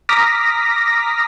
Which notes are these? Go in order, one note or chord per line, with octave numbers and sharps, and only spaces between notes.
A#5 D6 D#6 F6 A#6 B6